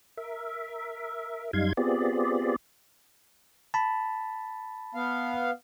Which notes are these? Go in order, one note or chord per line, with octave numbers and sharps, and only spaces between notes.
A#4 E5
F#2 G3 D#4 F5 C6 G#6
B3 C4 F4 G4 G#4 D5
A5 B5
B3 F5